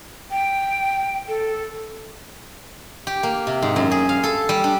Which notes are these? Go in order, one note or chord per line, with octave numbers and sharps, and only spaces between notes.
G5
A4
G4
A#3
C3
G#2
F#2
G#4
F5
A4
G3
D4